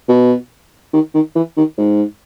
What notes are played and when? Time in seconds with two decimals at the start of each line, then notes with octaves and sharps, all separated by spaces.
0.08 B2
0.93 D#3
1.14 D#3
1.36 E3
1.57 D#3
1.78 G#2